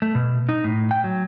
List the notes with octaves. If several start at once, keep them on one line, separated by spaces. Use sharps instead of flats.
A3
B2
D#4
A2
G5
F#3